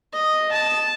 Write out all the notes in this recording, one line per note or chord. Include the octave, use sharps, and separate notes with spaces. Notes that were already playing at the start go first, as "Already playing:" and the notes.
D#5
A5